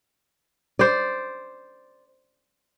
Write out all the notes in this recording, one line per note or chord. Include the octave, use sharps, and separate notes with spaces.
C5 D5